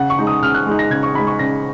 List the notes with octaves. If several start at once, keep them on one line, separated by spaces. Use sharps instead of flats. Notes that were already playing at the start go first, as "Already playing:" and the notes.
Already playing: C#3 F#5
C#6
G#3 D#4
D#6
C#3 F6
F#6
G#3 D#4
A#6
C#3 G#6
C#6
G#3 D#4 B5
C#6
C#3 A#6